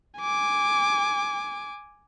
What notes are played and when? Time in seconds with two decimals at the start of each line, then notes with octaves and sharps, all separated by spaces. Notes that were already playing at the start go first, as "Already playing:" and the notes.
0.20 G#5 D6